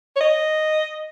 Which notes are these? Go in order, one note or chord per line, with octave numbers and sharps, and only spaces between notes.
C#5
D#5